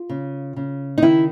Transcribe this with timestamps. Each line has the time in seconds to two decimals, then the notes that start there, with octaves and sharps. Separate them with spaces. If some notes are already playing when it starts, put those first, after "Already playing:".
Already playing: F4
0.09 C#3
0.56 C#3
0.98 D#4
1.02 D#3 E4